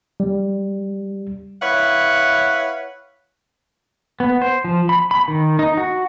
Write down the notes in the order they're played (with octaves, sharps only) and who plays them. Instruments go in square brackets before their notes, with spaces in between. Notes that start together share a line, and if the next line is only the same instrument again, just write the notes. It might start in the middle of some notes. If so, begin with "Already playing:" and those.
[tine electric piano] G3
[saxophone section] E4 B4 C#5 F5 F#5
[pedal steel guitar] B3
C5
F3
B5
B5
D#3
D#4
F#4